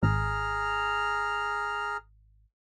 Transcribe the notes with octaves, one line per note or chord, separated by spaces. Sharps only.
G#1 G#4 A#5 F6